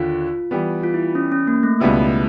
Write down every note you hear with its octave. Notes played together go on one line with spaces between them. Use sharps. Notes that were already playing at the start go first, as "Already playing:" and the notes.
Already playing: D#2 D3 F4
E3 G3 B3
F4
E4
C#4
C#4
A#3
A3
C#2 B2 G3 B3 E4